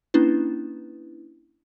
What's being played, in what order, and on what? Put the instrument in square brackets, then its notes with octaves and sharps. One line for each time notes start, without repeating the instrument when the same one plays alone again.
[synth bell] A#3 C#4 D4 E4 B4